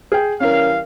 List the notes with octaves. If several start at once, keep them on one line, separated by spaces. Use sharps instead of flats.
G#4 G5
E3 G3 C#4 A#4 F5